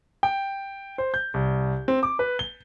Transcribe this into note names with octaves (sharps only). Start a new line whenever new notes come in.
G5
C5
G6
C2
C4
D6
B4
G7